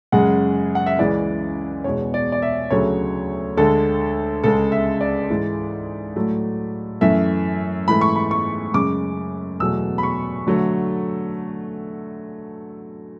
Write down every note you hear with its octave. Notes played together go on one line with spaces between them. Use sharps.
F#2 C#3 G#3 F#5
F#5
E5
C#2 C#3 E3 G#3 D5
E2 B2 G#3 C#5
D5
D5
E5
D2 C#3 F#3 A3 C#5
D2 D3 G#3 A4
C#2 C#3 G#3 A4
E5
D5
G#2 E3 G#3
A2 F#3 A3
F#2 E3 A3 E5
G#2 E3 A3 B5
C#6
B5
C#6
F#2 C#3 G#3 D6
E2 B2 F#3 A3 E6
B5
C#6
D3 F#3 A3